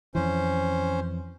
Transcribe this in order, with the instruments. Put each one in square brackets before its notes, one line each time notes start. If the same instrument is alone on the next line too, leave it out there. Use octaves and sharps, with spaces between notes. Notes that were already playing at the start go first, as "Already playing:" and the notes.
[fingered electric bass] F2 E3 [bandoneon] C#4 C5